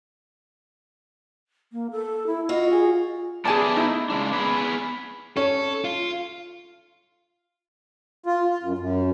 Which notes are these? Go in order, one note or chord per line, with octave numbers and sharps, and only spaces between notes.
A#3
A4
E4
F4 F#4 D#5
G#4
A3 B3 G#4 D5 G#5 A5
D#4 E4
C#3 G#3 D4
B3 G#4 B4
C#4 A4
F4
F4
F4
F#2
F#2